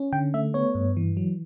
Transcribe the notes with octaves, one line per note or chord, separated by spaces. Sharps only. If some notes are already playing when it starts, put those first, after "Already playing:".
Already playing: C#4
D3 G5
A3 E5
B3 C#5
G2
E3
F#3